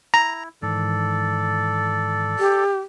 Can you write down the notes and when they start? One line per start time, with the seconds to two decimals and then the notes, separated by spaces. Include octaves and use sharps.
0.14 E4 A#5
0.62 G#2 D#3 E3 A4 D5
2.39 G4